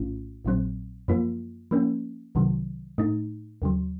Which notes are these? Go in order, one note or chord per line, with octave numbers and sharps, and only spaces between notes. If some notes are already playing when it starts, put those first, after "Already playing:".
Already playing: A#1 A2 A3 C#4 F4
A#1 A#2 F#3 C4
F#2 F3 A#3 F4
F3 A#3 C#4
C2 C3 D#3 F#3
A2 A3 D#4
D#2 C#3 F#3